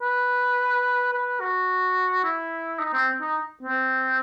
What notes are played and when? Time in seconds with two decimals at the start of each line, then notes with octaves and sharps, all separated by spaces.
0.02 B4
1.13 B4
1.41 F#4
2.24 E4
2.80 D#4
2.93 C4
3.21 D#4
3.63 C4